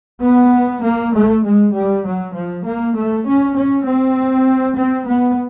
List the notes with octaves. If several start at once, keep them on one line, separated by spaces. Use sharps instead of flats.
B3
A#3
A3
G#3
G3
F#3
F3
A#3
A3
C#4
C#4
C4
C4
B3